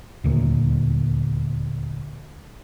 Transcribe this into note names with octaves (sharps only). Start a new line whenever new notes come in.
D#1 D2 A#2